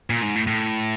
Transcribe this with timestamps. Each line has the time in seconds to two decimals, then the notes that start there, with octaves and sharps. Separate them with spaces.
0.10 A#2
0.22 G#2
0.35 A2
0.47 A2